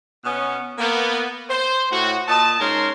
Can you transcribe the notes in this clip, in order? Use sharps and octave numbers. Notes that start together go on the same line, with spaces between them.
B2 B3 C#4
A#3 B3
C5
A2 F#4
A#2 D#5 A5
G#2 C#4 A#4 C6